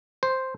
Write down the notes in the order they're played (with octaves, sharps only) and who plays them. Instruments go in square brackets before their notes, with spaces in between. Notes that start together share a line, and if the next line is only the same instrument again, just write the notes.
[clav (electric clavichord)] C5